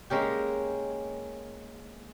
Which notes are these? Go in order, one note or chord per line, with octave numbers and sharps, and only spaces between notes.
G#3 A#3 C#4 G4